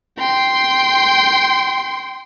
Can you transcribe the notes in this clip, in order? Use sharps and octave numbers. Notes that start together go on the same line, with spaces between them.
G5 C6